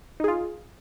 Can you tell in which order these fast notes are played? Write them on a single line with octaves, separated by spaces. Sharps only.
D#4 G#4 F4